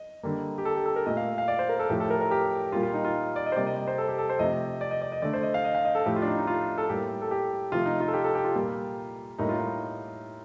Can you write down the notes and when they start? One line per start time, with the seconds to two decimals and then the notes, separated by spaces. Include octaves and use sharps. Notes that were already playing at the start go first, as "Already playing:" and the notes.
Already playing: D#5
0.23 D3 G3 A#3
0.58 G4
0.65 A4
0.76 G4
0.86 A4
0.96 A#4
1.06 A#2 A3 D#5
1.17 F5
1.38 F5
1.48 D5
1.59 C5
1.69 A#4
1.79 A4
1.90 A2 F3 A3 G4
2.00 A4
2.10 A#4
2.21 A#4
2.31 G4
2.72 A#2 G3 A#3 F4
2.83 F4
2.94 D#4
3.05 F4
3.36 D5
3.46 D#5
3.52 C5
3.56 C3 G3 A#3 D5
3.67 D#5
3.77 D#5
3.87 C5
3.98 A4
4.08 G4
4.18 A4
4.30 C5
4.39 C3 F3 A3 D#5
4.81 D5
4.91 D#5
5.02 D5
5.12 D#5
5.22 D3 A3 D5
5.33 C5
5.43 D#5
5.54 F5
5.64 D#5
5.75 F5
5.85 D#5
5.95 A4
6.06 A2 F3 A3 G4
6.16 F4
6.22 D4
6.27 D#4
6.37 D#4
6.47 F4
6.78 A4
6.89 A2 G3 A#3 G4
7.22 A4
7.31 G4
7.72 C3 F3 A3 F4
7.86 D#4
8.01 F4
8.08 A4
8.14 G4
8.24 A4
8.35 G4
8.44 F4
8.56 A#2 G3 A#3
9.38 A2 G3 A#3 D#4
9.49 F4
9.58 D#4